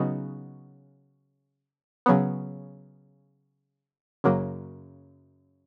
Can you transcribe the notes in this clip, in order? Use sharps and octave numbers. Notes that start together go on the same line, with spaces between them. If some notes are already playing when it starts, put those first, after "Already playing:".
Already playing: C#3 F#3 B3 D#4
C#3 F#3 B3
F#2 C#3 F#3 A#3